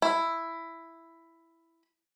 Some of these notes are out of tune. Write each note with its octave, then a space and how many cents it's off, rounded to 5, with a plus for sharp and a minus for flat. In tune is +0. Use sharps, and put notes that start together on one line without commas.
E4 +5